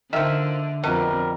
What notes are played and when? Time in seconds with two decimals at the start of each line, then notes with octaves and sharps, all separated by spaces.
0.13 D3 D#3 F3 E5
0.84 F2 B2 G3 A#4